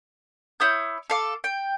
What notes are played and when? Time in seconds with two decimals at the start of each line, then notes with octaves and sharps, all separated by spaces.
0.60 E4 C#5 D#6 G6
1.10 A4 F5 D6
1.44 G5